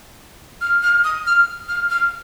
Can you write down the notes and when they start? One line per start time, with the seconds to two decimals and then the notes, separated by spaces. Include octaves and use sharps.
0.61 F6
0.83 F6
1.04 D#6
1.27 F6
1.68 F6
1.90 F6